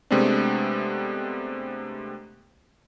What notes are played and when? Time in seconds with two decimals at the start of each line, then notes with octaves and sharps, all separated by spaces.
0.11 C3 G#3 A3 B3 C4 D4